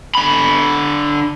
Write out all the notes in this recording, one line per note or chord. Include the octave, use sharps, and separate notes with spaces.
D3 B5